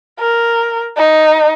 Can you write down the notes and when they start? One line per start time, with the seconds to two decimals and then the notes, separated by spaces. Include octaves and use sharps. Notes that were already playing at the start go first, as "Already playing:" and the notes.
0.20 A#4
0.97 D#4